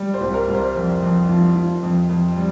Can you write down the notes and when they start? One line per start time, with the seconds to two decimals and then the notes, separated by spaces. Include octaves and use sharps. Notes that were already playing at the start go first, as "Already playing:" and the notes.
Already playing: G3
0.14 C5
0.21 C2
0.34 A#4
0.48 C2
0.55 C5
0.75 F2
1.02 F2
1.29 F3
1.55 F3
1.83 F2
2.09 F2
2.36 G3